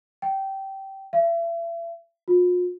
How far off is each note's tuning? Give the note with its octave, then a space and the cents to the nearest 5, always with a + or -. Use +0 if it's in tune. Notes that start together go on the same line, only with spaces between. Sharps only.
G5 -15
E5 +35
F4 +45